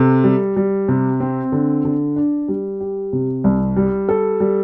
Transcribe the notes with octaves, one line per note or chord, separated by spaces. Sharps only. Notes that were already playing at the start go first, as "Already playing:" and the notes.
Already playing: C3 A4
G3
G3
C3
C4
D3
D3
D4
G3
G4
C3
C2
G3
A4
G3